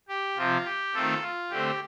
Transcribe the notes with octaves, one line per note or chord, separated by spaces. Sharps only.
G4
C3 F3 C4 F4
G4
D#3 A3 C4 F4 A4
F4
D3 A3 C4 G4